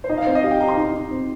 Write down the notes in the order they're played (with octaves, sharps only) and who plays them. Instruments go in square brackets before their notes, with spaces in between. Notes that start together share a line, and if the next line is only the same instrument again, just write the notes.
[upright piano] C5
[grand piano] D#4 [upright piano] D#5
[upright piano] F5
[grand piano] C4 [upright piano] C5
[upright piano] D#5
[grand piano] G4 [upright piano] F5
[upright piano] G5
[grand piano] D#4 [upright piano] A#5
[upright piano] C6
[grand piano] D#4
D#4
C4